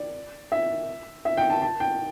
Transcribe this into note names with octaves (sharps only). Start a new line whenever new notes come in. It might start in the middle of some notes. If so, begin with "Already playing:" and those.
Already playing: D5
E5
E5
G5
A5
A5
G5